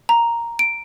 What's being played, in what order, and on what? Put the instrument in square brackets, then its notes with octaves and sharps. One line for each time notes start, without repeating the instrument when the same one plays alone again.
[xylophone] A#5
D7